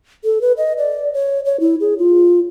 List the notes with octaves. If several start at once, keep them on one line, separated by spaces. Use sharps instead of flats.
A4
B4
D#5
D5
C#5
C#5
E4
G#4
F4